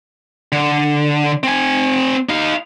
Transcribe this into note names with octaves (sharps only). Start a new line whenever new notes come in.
D3
C4 G#5
D#4 F5